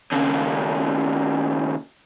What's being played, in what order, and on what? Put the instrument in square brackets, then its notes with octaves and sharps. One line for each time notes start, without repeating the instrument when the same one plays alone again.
[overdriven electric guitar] D#2 C#3